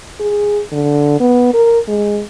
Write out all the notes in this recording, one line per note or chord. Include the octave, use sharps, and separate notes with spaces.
G#4
D3
B3
A#4
G#3